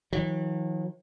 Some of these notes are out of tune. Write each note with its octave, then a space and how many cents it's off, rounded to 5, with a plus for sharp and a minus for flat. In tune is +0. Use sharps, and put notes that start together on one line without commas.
D#3 +45 F#3 -40